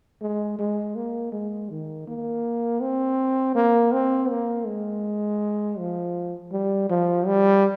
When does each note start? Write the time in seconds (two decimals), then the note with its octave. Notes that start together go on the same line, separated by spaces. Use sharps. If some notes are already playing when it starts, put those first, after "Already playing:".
0.21 G#3
0.59 G#3
0.96 A#3
1.32 G#3
1.70 D#3
2.07 A#3
2.81 C4
3.55 A#3
3.93 C4
4.30 A#3
4.66 G#3
5.79 F3
6.53 G3
6.90 F3
7.27 G3